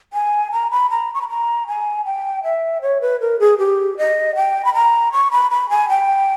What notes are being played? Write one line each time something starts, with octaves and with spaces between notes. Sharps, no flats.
G#5
A#5
B5
A#5
C#6
B5
A#5
G#5
G5
E5
C#5
B4
A#4
G#4
G4
D#5
G5
B5
A#5
C#6
B5
B5
G#5
G5